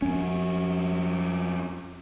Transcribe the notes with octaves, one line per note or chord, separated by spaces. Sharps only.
F2 C#4